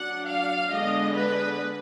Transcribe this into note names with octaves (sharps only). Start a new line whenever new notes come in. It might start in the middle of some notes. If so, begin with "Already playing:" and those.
Already playing: F#3 D4 F#5
F5
D3 G#3 B3 D4 D#5
B4